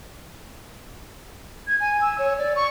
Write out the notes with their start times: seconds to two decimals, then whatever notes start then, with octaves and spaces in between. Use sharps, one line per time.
1.67 G#6
1.80 G#5
2.01 E6
2.19 C#5
2.38 D5
2.56 C#6